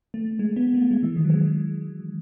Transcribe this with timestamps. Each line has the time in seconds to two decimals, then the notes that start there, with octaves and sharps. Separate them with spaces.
0.14 A3
0.39 G#3
0.56 B3
0.74 A3
0.91 G#3
1.03 E3
1.16 D#3
1.24 F#3
1.30 G#3